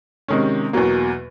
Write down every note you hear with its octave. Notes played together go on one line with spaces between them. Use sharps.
C3 D#3 G#3 C#4
E2 B2 F#3 A#3